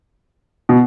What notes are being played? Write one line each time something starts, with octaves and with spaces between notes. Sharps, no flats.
B2